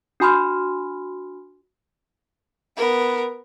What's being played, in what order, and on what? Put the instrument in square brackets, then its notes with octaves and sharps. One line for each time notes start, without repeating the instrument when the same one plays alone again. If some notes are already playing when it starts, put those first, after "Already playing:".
[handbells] D4 F#4 G#5 B5 C6 F6
[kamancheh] B3 A#4